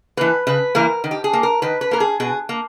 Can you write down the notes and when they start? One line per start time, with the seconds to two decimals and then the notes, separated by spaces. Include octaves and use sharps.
0.17 E3 A#3 B4
0.47 C#3 B4
0.75 E3 A#3 A#4
1.04 D#3
1.11 G4
1.24 G#4
1.33 A#3
1.43 A#4
1.62 D#3 B4
1.81 B4
1.91 A#3 A#4
2.00 G#4
2.20 B2 G#4
2.49 A#3